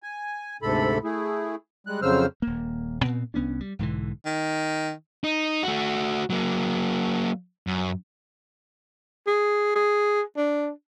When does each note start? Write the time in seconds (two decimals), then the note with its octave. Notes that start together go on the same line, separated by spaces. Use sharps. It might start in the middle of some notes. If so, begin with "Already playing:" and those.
0.03 G#5
0.62 D2 G#2 C3 A4 B5
1.04 A3 E4 G#4
1.87 G3 G#3 F#6
2.02 F2 C#3 F#3 C5 E6 F6
2.42 D#1 A#3
3.02 A#2 B3 C4
3.34 C2 B3 C#4 D4
3.61 G3
3.79 B1 G#2 D3 E3
4.26 D#3
5.24 D#4
5.63 A3 F#4
6.30 F#3 A#3
7.67 F#2
9.27 G#4
9.75 G#4
10.37 D4